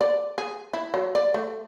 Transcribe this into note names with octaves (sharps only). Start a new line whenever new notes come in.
D5
G#4
E4
F#3
D5
A3